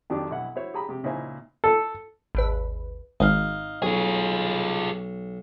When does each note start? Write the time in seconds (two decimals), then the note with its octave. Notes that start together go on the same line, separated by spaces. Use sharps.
0.10 F2 D#3 F#3 D4 G4 D6
0.31 B1 E4 F#5
0.56 E4 F#4 C5 C#5
0.74 G4 G#4 A#5 B5
0.89 C3 G4
1.03 C#2 A#2 D#4 E4 C5 G#5
1.64 A4
2.35 G#1 D#2 B4
3.20 G#1 D#4 F5
3.82 B1 F4 G#4